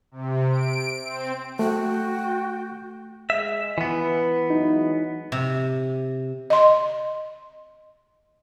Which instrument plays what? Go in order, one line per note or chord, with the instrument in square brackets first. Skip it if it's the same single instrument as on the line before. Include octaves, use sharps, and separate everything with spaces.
[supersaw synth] C3
D7
C4
[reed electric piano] A3 [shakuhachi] F#4 [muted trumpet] G5
[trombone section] G#3 G#4 [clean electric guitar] E5
[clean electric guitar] E3 B3 [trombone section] B4
[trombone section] F#3 G#3 [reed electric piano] D#4
[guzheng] C3
[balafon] D#5 C6